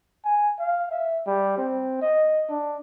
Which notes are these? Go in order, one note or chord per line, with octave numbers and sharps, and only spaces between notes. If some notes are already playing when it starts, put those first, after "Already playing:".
G#5
F5
E5
G3
C4
D#5
D4